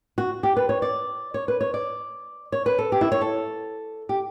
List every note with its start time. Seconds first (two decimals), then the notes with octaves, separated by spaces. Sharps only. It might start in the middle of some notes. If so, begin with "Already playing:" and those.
0.18 F#4
0.43 G4
0.57 B4
0.69 C#5
0.82 D5
1.34 C#5
1.48 B4
1.61 C#5
1.74 D5
2.52 C#5
2.66 B4
2.79 A4
2.92 G4
3.01 E4
3.12 C#5
3.21 A4
4.09 G4